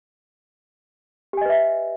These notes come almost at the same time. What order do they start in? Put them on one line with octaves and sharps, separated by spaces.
G4 G#5 D#5 B4 E5